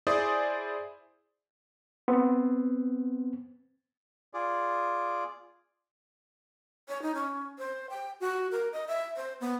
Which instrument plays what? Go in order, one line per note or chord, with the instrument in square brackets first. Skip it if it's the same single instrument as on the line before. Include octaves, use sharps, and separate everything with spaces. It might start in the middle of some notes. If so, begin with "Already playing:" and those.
[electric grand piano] E4 G#4 C5 D5 G#5 D#6
[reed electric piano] B3 C4
[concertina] F4 G#4 D5
[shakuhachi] C#5
D#4
C#4
C5
G5
F#4
A#4
D#5
E5
C5
B3